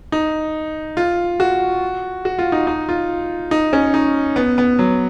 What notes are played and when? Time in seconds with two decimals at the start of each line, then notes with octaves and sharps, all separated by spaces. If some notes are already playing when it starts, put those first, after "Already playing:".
0.12 D#4
0.97 F4
1.40 F#4
2.25 F#4
2.39 F4
2.52 D#4
2.67 D#4
2.89 F4
3.51 D#4
3.73 C#4
3.94 D#4
4.36 B3
4.58 B3
4.79 F#3